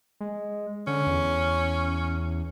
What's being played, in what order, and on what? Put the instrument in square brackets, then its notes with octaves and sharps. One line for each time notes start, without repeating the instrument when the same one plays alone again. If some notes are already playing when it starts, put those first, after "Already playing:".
[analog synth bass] G#3
[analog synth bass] D3 [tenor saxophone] C#4
[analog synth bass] E2